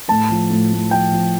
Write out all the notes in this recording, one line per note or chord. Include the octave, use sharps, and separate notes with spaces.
A2 A5
F3
A2
A2
F3 G5
F3